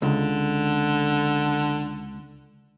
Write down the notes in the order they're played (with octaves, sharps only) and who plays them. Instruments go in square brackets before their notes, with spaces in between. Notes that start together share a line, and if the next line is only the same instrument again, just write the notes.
[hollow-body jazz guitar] C#2 [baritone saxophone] D3